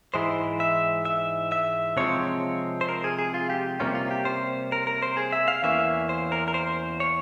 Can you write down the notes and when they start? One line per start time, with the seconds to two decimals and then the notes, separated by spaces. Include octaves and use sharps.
0.14 G#2 E3 G#3 E4 C5
0.60 E5
1.05 E5
1.52 E5
1.97 C3 F3 G#3 C4 C#5
2.81 C5
2.89 A#4
3.04 G#4
3.19 G#4
3.34 F4
3.50 G4
3.80 C3 G3 A#3 C#4 F4
3.95 F4
4.11 G4
4.25 C5
4.72 A#4
4.87 A#4
5.02 C5
5.17 G#4
5.33 E5
5.48 F5
5.63 E2 E3 A#3 C#4 E5
6.09 C5
6.32 A#4
6.48 A#4
6.54 C5
7.00 C#5